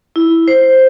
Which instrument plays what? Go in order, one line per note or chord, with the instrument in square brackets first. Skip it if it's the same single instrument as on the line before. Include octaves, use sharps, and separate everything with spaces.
[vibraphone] E4
C5